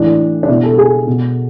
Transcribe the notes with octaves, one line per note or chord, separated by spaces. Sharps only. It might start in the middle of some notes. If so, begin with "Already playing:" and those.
Already playing: A2 E3 D4
D4
B2 E4
A4
G#4
B2